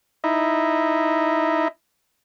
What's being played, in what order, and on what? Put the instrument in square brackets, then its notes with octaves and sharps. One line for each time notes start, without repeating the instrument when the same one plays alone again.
[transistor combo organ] D#4 E4